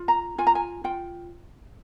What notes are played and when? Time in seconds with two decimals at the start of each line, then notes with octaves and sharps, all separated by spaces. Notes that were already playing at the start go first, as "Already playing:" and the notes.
Already playing: F4
0.08 A#5
0.38 F4 G#5
0.47 A#5
0.55 G#5
0.84 F4 G5